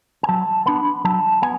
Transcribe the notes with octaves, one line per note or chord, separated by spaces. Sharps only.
G#5
F#3 A5
B3 D4 B5
F#3 A5
B3 G#5